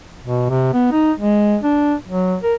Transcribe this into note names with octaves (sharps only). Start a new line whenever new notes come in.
B2
C3
B3
D#4
G#3
D4
F#3
A#4